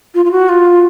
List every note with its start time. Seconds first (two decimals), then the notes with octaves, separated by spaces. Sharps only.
0.14 F4
0.25 F4
0.31 F#4
0.49 F4